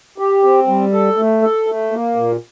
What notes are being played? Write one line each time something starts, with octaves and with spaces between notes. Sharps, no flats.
G4
C4
G3
A4
A3
A4
A3
A#3
A#2